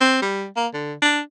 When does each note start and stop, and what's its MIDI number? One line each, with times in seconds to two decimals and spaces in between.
0.01 0.21 60
0.22 0.46 55
0.56 0.67 58
0.74 0.93 50
1.02 1.20 62